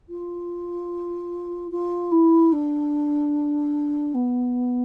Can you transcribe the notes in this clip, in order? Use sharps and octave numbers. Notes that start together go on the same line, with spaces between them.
F4
F4
E4
D4
B3